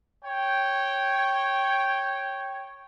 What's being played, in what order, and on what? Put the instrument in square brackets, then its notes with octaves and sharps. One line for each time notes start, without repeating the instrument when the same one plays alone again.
[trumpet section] C#5 G5